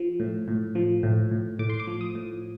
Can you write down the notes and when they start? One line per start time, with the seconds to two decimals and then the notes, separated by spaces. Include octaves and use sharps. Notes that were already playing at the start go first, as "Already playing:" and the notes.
Already playing: F3
0.20 A2
0.48 A2
0.75 F3
1.03 A2
1.31 A2
1.59 A2 D6
1.70 C6
1.80 D6
1.87 F3
2.01 D#6
2.15 A2